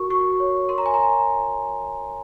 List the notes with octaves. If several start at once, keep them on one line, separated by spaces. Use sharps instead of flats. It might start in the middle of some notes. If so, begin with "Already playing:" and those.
Already playing: F#4 A#4 C#6
F#4 C#6
C#5
A#4 C6
A#5
G#5
A#5